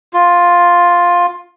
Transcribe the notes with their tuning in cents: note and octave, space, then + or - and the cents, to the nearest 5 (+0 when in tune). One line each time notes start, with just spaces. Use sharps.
F4 +5